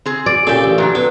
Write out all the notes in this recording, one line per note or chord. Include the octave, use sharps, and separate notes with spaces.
C4 G#4
D5
A#2 C#3 G4 A4
A1
A#2 F#3 D4
F#3 B3